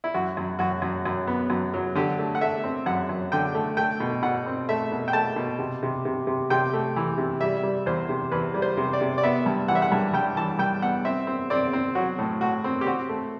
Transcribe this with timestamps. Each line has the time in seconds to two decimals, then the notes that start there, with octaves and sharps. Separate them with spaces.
0.04 E4
0.14 F#2 F#4
0.37 F#2
0.59 F#2 F#4
0.82 F#2
1.05 F#2
1.27 B3
1.50 F#2
1.74 F#3
1.95 D3 G4
2.18 A3
2.35 F#5
2.41 A3 E5
2.64 C4
2.86 F#2 F#5
3.09 F#2
3.32 D3 G5
3.55 A3
3.77 A3 G5
4.00 B2
4.22 B2 F#5
4.46 C4
4.69 A3 E5
4.92 B2
5.08 G5
5.13 A3 A5
5.36 B2
5.59 C3
5.83 C3
6.05 C3
6.27 C3
6.50 C3 G5
6.73 A3
6.96 E3
7.18 C3
7.41 G3 E5
7.63 G3
7.86 E2 C5
8.09 C3
8.31 E2 B4
8.54 G3
8.62 C5
8.77 C3
8.93 D5
9.01 C3
9.18 D5
9.23 B3 E5
9.46 G2
9.68 E3 F#5
9.75 E5
9.82 F#5
9.92 G2
10.14 G2 G5
10.36 E3 A5
10.59 G2 G5
10.82 B3 F#5
11.05 C4 E5
11.27 C4
11.50 C4 D5
11.73 C4
11.95 F#3 F#4
12.19 A2
12.41 A2 F#4
12.64 C4
12.81 G4
12.86 C4 F#4
13.09 A3